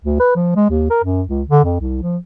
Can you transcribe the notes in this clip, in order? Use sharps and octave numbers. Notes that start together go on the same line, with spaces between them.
D2
B4
F3
G#3
D#2
A#4
F#2
C#2
D3
F2
C2
F3